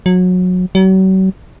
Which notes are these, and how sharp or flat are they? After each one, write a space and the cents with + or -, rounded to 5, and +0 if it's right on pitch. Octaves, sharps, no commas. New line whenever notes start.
F#3 -25
F#3 +40